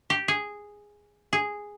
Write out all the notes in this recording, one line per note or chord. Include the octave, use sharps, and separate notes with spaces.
G4
G#4
G#4